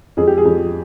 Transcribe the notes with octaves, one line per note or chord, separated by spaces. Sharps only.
F2 G#4
G4
G#4
F2